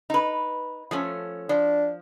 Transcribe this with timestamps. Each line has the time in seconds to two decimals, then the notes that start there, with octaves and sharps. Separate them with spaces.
0.10 D#4 B4
0.91 F3 A3 C#4
1.49 F3 D4